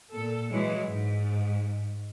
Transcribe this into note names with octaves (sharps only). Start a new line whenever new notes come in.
A#2 A4
E3 F#3 G#3
G#2